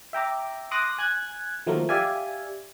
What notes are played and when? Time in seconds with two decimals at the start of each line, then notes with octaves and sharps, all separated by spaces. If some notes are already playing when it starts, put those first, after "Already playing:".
0.13 E5 G5 A#5 D6
0.71 C6 D6 D#6 F#6 A#6
0.98 G#5 F#6 G#6
1.66 D#3 F3 F#3 A3 A#3 A#4
1.89 G4 D5 E5 F5 G#5